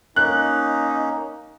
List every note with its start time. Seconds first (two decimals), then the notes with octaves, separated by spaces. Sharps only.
0.16 A#3 C#4 D#4 F#6